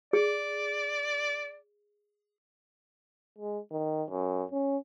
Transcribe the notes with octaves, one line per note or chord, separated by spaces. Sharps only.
G#4 D5
G#3
D#3
F#2
C#4